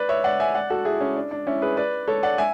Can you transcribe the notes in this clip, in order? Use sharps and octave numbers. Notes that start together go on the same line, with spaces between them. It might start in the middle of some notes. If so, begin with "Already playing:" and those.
Already playing: B4 D5
C#5 E5
D5 F#5
E5 G#5
D5 F#5
F#4 A4
E4 G#4
C#4
D4
D4
C#4 E4
G#4 B4
B4 D5
A4 C#5
D5 F#5
E5 G#5